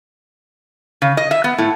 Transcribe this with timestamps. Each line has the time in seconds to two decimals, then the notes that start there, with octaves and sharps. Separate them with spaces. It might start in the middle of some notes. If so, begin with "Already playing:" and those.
1.02 C#3
1.17 D#5
1.31 E5
1.44 B3
1.58 A2